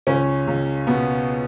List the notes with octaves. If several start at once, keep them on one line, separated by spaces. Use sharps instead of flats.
C#2 C#4
C#2
B2 B3